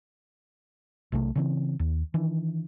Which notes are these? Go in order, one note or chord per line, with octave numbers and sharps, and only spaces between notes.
B1 C3 F#3 A3
C#3 E3 C4
D#2
D#3 E3 D4